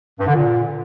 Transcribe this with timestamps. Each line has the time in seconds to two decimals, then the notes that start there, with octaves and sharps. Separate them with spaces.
0.19 G2
0.27 D3
0.35 A#2